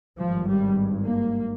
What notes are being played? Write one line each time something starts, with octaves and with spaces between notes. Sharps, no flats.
G#1 G2 F3
G3
A#3